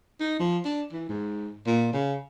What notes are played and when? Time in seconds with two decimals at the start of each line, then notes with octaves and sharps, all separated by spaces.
0.20 D#4
0.40 F3
0.65 D4
0.93 E3
1.09 G#2
1.67 A#2
1.93 C#3